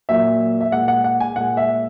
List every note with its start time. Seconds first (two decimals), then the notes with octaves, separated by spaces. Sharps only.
0.09 A#2 F#3 A#3 E5
0.61 E5
0.72 A#2 G#3 F#5
0.88 F#5
1.04 F#5
1.20 G#5
1.36 A#2 G#3 F#5
1.57 E5